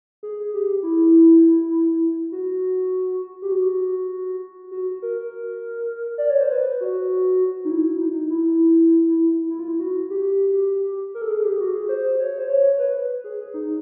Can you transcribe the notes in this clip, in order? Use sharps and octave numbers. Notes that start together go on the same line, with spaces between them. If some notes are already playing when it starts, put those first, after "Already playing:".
G#4
G4
E4
F#4
G4
F#4
F#4
A#4
D5
C#5
C5
B4
F#4
D#4
E4
D#4
E4
E4
F4
E4
F#4
G4
A#4
A4
G#4
G4
F#4
G#4
C5
C#5
C5
C#5
B4
G#4
G#4
D#4